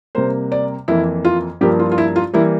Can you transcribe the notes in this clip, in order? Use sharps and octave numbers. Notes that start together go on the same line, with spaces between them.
C3 G3 A#3 C5
D5
F2 E3 A#3 E4
F4
G2 F3 A#3 G4
F4
F4
E4
F4
E3 G3 A#3 E4